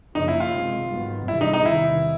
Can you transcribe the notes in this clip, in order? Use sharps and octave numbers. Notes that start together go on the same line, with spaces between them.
F#2 C#3 F3 A#3 C#4 D#4
E4
F4
C3 D#3 G#3 C4
G#2 D#3 F#3 B3
F2 C3 E3 G3 E4
D#4
D#4
E2 C3 D#3 E4